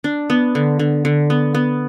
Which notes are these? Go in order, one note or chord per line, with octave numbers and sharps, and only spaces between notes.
D4
B3
D3
D3
D3
B3
B3